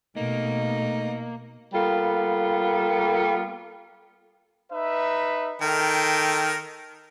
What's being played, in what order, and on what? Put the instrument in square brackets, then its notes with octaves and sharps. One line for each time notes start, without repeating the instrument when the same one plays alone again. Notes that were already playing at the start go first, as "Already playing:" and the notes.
[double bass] B2 [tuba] A3 [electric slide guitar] A#3 [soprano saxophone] D#4
[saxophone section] G3 A#3 B3 F4 A4
[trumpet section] D#4 B4 E5
[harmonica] D#3 A#4 [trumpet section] A4 G5